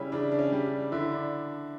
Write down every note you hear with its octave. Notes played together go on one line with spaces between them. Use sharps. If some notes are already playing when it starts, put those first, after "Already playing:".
Already playing: C#3 G3 C#4 E4
C#3 D4
D4
C#4
G3
D4
D3 E4
D4